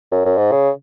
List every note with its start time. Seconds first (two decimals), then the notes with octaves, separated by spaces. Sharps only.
0.12 F#2
0.25 F#2
0.38 G#2
0.52 C#3